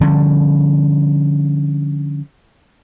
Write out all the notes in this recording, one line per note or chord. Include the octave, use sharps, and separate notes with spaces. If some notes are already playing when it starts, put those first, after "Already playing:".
D3 F3 G3 C#4